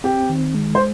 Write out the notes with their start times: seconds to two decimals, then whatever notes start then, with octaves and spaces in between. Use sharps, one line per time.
0.04 C4 G4
0.29 D#3
0.54 G#3
0.75 C5